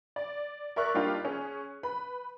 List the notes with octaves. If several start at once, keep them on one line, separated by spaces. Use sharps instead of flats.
D5
A#4 D5 E5 C#6 F#6
G3 A#3 D4 D#4 F4 G4
C#4 G#4
B4 B5